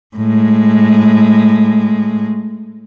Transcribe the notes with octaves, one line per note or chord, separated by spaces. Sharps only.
A2 G#3